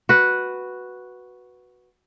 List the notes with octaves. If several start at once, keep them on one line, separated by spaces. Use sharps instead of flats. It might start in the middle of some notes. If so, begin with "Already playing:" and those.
F#4 B4